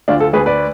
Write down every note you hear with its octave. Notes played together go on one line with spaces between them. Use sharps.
D2 D4 F4
F4 A4
D2 G#4 B4
B4 D5